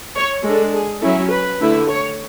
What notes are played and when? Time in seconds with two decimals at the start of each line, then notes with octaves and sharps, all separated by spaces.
0.16 C#5
0.45 G#3 D4 A4
0.74 G#4
1.02 F#3 C#4 E4 A4
1.31 B4
1.60 D3 A3 E4
1.89 C#5